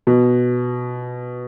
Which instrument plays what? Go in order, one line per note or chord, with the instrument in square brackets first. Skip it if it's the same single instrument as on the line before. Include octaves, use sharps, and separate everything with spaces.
[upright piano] B2